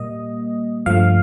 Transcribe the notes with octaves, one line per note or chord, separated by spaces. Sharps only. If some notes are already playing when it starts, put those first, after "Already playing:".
Already playing: A#2 G3 A#3 D#5
G2 F3 A3 F5